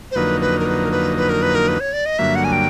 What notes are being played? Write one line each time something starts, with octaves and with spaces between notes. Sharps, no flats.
C5
F2 D3 F#3 A#3 D#4 B4
B4
A#4
B4
A#4
B4
B4
A#4
B4
A#4
B4
C#5
D5
D#5
G2 D3 F#3 A#3 E5
F#5
G#5
G5